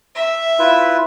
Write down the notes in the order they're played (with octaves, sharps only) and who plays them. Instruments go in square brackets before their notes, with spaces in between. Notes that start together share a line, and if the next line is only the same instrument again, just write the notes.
[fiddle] E5
[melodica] E4 F4 B4